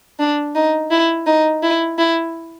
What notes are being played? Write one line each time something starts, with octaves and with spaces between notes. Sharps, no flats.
D4
D#4
E4
D#4
E4
E4